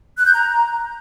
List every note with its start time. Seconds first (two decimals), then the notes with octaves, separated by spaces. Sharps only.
0.18 F#6
0.26 G6
0.34 A#5